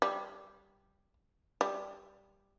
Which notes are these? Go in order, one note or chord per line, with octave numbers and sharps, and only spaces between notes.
G3
G3